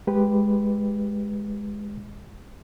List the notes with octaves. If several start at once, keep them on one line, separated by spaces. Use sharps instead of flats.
G#3 G4 B4